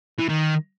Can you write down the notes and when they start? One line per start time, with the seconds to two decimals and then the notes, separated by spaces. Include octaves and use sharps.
0.19 E3
0.29 D#3